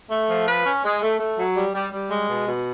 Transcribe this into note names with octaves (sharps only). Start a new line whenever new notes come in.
A3
F3
B4
C#4
G#3
A3
A3
F#3
G3
G3
G3
G#3
B2
B2